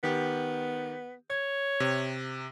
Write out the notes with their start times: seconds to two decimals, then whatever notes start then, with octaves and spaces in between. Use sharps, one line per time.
0.03 D#3 B3 G4
1.30 C#5 G#6
1.80 C3